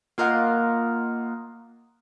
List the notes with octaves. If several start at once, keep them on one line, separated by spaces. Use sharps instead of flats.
A#3 F4 A#4 D#5 F5 F#5